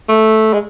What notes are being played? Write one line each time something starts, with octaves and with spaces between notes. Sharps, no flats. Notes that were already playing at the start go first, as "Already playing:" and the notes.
A3
G#3